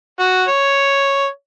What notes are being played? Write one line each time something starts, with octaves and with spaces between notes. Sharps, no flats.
F#4
C#5